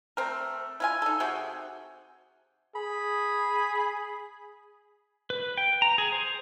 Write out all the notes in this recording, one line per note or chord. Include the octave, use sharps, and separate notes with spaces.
A3 C4 A#4
E4 F4 G#5
D#4 A4
C3 F#4 G#4 G5
G#4 B5
B4
G5
A#5
G#4
C5